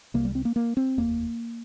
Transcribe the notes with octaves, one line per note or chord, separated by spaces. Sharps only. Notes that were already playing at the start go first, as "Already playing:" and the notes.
C2 C3 A#3
G3
C4
A#3
A#3
C4
F1 D#2 A#3